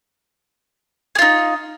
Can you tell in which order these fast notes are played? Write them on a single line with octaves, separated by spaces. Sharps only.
G#4 F4 D#4